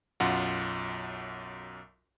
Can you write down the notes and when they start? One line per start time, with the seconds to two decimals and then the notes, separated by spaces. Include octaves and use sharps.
0.20 B1 F#2 F4 F#5